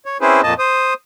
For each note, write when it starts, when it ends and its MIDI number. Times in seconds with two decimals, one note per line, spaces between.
0.06 0.17 73
0.21 0.41 60
0.21 0.41 61
0.21 0.41 64
0.21 0.41 68
0.21 0.41 71
0.21 0.41 72
0.43 0.54 41
0.43 0.54 46
0.43 0.54 58
0.43 0.54 75
0.43 0.54 81
0.59 0.94 72
0.59 0.94 87